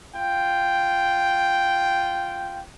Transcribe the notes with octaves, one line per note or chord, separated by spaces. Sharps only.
F4 G5